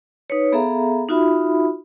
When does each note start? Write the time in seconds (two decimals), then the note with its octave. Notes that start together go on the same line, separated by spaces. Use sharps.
0.30 D#4 B4 C#5
0.52 B3 G#4 A4 E5 F5 A#5
1.09 D#4 F4 F#4 E5 B5